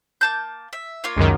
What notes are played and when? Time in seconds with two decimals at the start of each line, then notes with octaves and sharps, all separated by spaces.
0.21 A#3 A5 G6
0.73 E5
1.04 A#3 F4 C#5
1.16 C#2 F#2 D#3